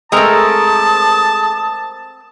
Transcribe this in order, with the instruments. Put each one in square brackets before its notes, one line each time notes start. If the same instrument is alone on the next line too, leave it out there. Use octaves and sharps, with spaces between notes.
[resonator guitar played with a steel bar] G#3 A3 [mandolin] C4 A#4 A#5 [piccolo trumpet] A5 [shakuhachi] D#6